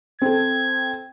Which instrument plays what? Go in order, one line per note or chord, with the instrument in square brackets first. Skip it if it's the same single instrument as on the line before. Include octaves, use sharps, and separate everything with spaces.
[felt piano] C4 A4 [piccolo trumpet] G#6